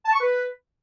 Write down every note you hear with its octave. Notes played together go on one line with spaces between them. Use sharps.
A5
C#6
B4